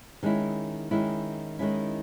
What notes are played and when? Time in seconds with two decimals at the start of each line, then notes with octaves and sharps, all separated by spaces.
0.23 D#3 G#3 C#4 E4
0.91 D#3 G#3 C#4 E4
1.59 D#3 G#3 C#4 E4